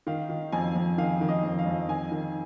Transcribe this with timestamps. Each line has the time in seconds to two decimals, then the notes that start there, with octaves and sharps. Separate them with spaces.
0.07 D#3 F5
0.30 D#3
0.52 F2 G#5
0.75 F2
0.98 D#3 F5
1.21 D#3
1.28 D#5
1.43 F2
1.59 F5
1.66 F2
1.89 D#3 G#5
2.12 D#3